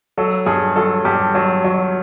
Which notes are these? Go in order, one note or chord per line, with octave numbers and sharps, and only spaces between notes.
F#3 A4
G2 G#4
F#3 A4
G2 G4
F#3
F#3